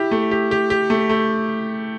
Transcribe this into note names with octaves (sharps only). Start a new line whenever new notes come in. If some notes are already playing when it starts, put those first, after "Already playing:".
Already playing: E4 G4
A3
G4
G4
G4
A3
A3